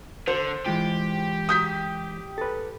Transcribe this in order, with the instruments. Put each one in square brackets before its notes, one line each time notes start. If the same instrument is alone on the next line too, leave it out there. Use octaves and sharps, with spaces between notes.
[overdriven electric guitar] D3 [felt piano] C5
[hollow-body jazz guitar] E3 G#3 F4 [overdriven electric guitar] G4
[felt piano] D#6 G6 B6
[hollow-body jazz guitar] A4 B4